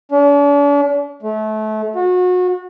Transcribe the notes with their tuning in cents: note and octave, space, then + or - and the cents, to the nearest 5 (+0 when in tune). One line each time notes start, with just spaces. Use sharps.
D4 -45
A3 -25
F#4 -30